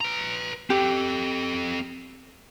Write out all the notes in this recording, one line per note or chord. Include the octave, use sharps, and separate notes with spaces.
B4 A#5
C4 G4 A4